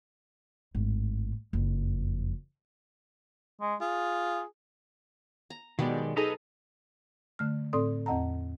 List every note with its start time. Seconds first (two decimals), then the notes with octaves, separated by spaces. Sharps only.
0.75 G#1 A2
1.53 F#1 F2
3.61 G#3
3.81 F4 G#4
5.50 A#5
5.79 B2 D#3 F#3 G#3 B3 G4 D5
6.17 D#4 G#4 A4 B4 D#5 A#5
7.39 D3 A3 F6
7.73 A2 C4 A4 D5 C6 D#6
8.06 E2 C4 D#5 F#5 A5 A#5